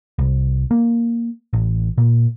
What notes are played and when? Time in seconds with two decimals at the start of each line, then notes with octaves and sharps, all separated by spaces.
0.19 C2
0.71 A#3
1.53 A1
1.98 A#2